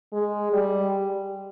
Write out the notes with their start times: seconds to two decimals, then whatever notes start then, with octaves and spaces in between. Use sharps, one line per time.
0.13 G#3
0.53 G3